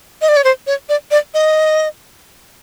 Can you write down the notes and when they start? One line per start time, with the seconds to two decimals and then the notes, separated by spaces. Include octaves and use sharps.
0.22 D#5
0.29 D5
0.37 C#5
0.44 C5
0.67 C#5
0.89 D5
1.11 D5
1.34 D#5